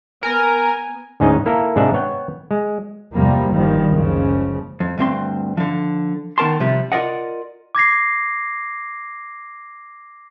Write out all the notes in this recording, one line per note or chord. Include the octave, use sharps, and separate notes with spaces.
B3 A#4 G#5
D2 G#2 C#4 D#4 D#5
A#3 E4 A4 A#4
G#2 C3 D4 D#4 E5 F5
B3 C#5 F#5 G5
G#3
E2 G2 C3 F3 G3 A#3
G1 D#3 F3 G3
F#1 C#2 C#3 F3
F2
D2 G2 C4 C6
D3 F3
D#3 B3 A#4 A5 C6
C3 F3 G3
F4 A#4 D5 D#5 F#5
D6 G#6 A#6 C7